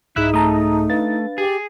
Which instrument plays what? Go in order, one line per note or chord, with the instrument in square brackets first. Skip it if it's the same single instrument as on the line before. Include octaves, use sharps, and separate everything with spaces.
[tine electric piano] C2 G#2 G#4 [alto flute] D#4 [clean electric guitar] E4 E5 [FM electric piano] F#6
[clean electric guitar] A3 [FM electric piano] A5 A#5 D#6
[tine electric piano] D4 B4 F5 [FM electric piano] A6
[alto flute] G4 [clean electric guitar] G#4